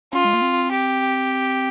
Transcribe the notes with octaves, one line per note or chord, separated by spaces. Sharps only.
C#4 F4
G#3
A#3
C4
G4